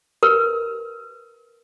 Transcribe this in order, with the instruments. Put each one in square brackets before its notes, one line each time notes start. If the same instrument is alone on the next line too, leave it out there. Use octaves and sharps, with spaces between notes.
[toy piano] A#4 B4